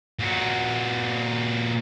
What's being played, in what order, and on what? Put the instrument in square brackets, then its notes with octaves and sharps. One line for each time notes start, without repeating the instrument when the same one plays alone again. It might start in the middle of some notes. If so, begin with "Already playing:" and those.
[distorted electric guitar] A#2 F#4